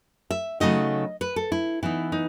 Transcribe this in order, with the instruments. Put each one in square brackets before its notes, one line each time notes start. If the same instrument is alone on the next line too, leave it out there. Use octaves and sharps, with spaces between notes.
[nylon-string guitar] E5
C#3 F#3 A3 D#4 D#5
B4
A4
E4
E3 B3 D#4 E4
D#4